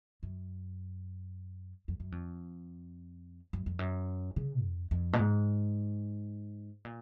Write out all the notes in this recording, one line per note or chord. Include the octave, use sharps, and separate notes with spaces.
F#2
F2
F#2
F2
F#2
F2
F#2
C#3
F2
F2
A#2
G#2
A#2